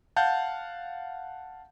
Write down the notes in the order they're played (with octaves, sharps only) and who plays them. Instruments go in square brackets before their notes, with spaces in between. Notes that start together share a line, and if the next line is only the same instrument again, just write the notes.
[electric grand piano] F5 F#5 A5 G6